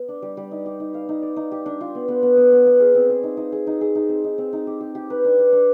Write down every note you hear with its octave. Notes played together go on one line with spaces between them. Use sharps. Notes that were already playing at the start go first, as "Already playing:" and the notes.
Already playing: B3
D4
G3
G3
D#4
G4
D#4
F5
D#4
D5
D#4
G4
D4
F4
B3
B3
B3
B3
B3
B3
G#4
C4
G#4
D#4
D#4
G#4
D#4
G#4
D#4
C4
D#4
C4
D#4
G4
G4
G4
B4
D4
B4
D4